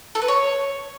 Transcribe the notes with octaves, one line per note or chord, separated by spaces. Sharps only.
A4
B4
C#5